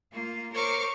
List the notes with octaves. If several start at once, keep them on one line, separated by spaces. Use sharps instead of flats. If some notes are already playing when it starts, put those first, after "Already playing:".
A#3 F4
A#4 C5 C#5 C#6 D6 F6